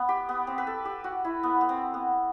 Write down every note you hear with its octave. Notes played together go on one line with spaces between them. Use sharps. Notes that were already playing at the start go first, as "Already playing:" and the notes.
Already playing: B3
G4
B3
C4
B4
A4
G4
F#4
E4
B3
B3
C4
B3